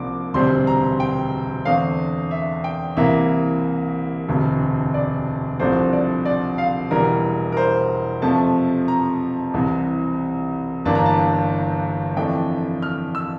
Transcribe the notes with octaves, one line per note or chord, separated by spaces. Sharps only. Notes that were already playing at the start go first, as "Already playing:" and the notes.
Already playing: C2 C3 F3 A#3 D4 D6
E1 D2 C3 G3 C4 C6
A#5
G5
E2 D3 A3 C4 F5
E5
G5
C2 C3 E3 A#3 E5
E1 D2 C3
D5
C2 C3 F3 A3 D4 C5
D5
D5
F5
E1 E2 E3 G3 A#4
A#4
C5
F2 C3 F3 A3 A5
A#5
C2 C3 E3
G1 G2 E3 A#3 D4 A5
A#5
A5
F2 E3 A3 D4 G5
F6
E6